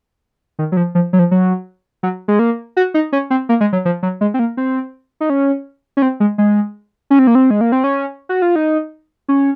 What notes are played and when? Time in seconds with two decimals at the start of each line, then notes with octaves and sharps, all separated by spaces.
0.59 D#3
0.72 F#3
0.77 F3
0.95 F3
1.13 F#3
1.19 F3
1.31 F#3
2.03 F#3
2.28 G#3
2.39 A#3
2.77 F#4
2.94 D#4
3.12 C#4
3.30 C4
3.49 A#3
3.61 G#3
3.73 F#3
3.85 F3
4.03 F#3
4.21 G#3
4.34 C4
4.39 A#3
4.57 C4
5.21 D#4
5.30 C#4
5.97 C#4
6.02 C4
6.20 G#3
6.38 G#3
7.10 C#4
7.19 C4
7.27 A#3
7.35 C4
7.50 G#3
7.61 A#3
7.72 C4
7.84 C#4
8.29 F#4
8.42 F4
8.56 D#4
9.28 C#4